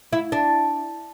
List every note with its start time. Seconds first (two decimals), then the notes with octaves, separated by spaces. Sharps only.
0.13 E4
0.32 D4